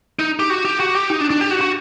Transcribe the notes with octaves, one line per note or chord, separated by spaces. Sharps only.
D#4
G4
F#4
G4
F#4
G4
D#4
D4
D4
G4
F#4
F#4